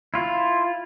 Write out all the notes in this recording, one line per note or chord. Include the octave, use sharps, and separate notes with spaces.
E4 F4